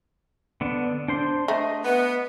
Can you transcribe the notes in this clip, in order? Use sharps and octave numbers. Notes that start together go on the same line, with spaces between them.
D3 B3 D4
D4 C5 C6
A3 D#5
B3